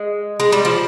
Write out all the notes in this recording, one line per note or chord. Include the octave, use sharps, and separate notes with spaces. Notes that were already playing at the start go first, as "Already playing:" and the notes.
Already playing: G#3
G#3
G3
F3